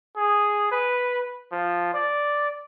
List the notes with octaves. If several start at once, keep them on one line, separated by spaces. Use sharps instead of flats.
G#4
B4
F3
D5